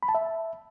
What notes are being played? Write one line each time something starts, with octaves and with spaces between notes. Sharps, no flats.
B5
A5
E5